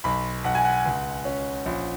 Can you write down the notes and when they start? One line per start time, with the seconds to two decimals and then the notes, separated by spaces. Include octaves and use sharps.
0.04 B1 B5
0.44 B1 F#5
0.55 G#5
0.65 F#5
0.85 C#2
1.25 C#4
1.66 A#1